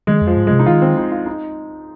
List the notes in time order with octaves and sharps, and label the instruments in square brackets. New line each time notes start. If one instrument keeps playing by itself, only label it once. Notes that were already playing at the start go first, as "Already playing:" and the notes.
[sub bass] D#3 [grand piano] G#3
[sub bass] F2
[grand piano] F3
[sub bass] G#2
[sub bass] C3 [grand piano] G#3
[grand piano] D#4
[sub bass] D#3 [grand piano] F4
[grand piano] C4
D#4
F4
D#4